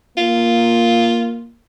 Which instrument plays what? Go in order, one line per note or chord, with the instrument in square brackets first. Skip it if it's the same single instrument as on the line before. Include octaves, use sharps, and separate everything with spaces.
[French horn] A#3 [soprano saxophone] F4